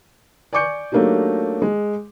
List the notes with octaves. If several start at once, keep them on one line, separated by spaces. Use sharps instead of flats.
D5 G#5 C#6 D6 G6 C#7
F#3 A3 A#3 D4 D#4 G4
G#3